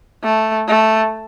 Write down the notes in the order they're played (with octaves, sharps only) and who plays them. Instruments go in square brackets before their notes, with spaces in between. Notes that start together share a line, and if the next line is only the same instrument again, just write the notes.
[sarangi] A3
A3